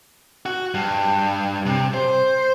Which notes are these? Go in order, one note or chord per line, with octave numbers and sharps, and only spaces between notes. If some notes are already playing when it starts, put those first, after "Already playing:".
F#4
G2
C3
C5